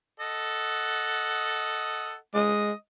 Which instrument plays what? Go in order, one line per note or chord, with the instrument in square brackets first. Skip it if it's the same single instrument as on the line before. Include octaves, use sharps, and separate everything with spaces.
[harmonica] A4 D#5 F#5
[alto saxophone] G#3 [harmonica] D#5